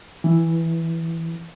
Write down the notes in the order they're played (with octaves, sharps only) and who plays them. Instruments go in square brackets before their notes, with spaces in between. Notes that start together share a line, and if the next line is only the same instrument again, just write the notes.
[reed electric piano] E3